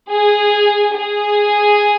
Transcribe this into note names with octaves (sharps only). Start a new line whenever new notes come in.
G#4
G#4